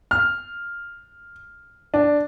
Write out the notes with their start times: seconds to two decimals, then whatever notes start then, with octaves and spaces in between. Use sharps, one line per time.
0.11 F6
1.94 D4